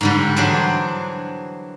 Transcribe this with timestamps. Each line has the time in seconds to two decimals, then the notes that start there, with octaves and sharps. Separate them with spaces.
0.01 G#2 D3 G3
0.36 E3 F#3 D4 G#4 C5